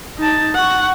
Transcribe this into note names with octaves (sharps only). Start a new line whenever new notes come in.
D#4 A5
F#5 C#6